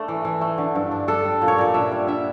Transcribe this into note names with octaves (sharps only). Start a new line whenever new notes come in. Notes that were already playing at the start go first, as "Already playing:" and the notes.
Already playing: A3 D4 A4
E3
E3
A3
D3
G2
D4
D4 A4
G3
A#2
C#5
A#2 D5
D4 E5
G3
D3 E5